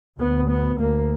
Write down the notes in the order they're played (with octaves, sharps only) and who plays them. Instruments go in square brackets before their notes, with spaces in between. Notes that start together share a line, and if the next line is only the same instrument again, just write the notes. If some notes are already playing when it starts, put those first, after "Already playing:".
[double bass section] D2 B3
B3
D2 A#3